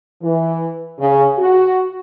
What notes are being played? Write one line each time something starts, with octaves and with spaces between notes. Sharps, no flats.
E3
C#3
F#4